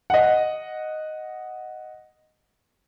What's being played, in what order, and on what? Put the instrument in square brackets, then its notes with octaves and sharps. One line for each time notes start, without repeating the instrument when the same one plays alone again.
[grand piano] D#5 F#5